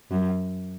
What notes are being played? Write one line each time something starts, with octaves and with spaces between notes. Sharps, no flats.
F#2